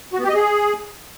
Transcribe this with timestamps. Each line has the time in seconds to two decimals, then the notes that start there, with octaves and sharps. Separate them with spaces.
0.13 F#4
0.18 B3
0.24 G4
0.29 D#5
0.34 G#4